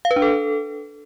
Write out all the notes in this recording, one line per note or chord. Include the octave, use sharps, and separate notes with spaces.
F5
B4
D4
A4